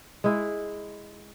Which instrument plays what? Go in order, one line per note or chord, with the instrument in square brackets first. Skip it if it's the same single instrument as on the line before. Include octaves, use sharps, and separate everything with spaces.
[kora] G#3 E4